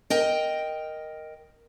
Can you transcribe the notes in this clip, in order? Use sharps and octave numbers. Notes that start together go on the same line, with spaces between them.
A#4 D#5 G5